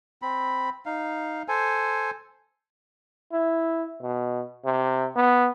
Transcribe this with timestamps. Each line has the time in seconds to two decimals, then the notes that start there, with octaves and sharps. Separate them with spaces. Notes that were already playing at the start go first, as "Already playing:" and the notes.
0.22 C4 B5
0.86 D#4 F5
1.48 A4 C5 G#5
3.32 E4
4.02 B2
4.65 C3
5.16 B3